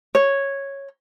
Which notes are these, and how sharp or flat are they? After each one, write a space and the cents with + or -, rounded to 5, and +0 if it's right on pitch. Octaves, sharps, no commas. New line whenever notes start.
C#5 -5